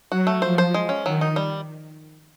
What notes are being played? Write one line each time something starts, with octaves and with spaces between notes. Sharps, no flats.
F#3 F#4
A3
F3 C5
C5
G#3
C#4
D#3 F#3
D#4
G3